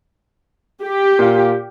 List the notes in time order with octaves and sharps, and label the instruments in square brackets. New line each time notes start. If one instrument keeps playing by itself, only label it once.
[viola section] G4
[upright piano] A#2 F4